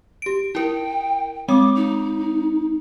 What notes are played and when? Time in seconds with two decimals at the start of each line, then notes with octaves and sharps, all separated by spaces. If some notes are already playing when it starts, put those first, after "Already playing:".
0.22 G4 D7
0.55 E4 A#4 G5
1.48 G#3 C4 D6 D#6
1.76 D#4